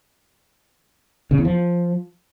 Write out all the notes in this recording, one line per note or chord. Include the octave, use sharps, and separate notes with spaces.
C#3
E2
F3